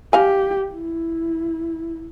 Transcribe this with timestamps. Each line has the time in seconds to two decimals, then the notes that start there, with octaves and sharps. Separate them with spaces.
0.13 G4 D#5 F5 G#5
0.73 E4